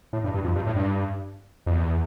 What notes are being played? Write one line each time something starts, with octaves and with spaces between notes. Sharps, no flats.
A2
G2
G2
F2
G2
A2
G2
F2
E2